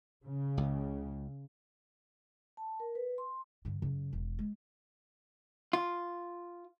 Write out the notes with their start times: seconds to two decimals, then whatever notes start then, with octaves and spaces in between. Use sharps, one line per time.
0.24 C#3
0.57 C#2
2.57 A5
2.80 A#4
2.95 B4
3.18 C6
3.65 G2 D3
3.82 F#2 C#3
4.13 E1
4.39 G#3
5.73 F4